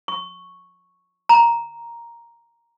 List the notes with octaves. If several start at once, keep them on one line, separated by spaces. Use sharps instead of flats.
C#6
A#5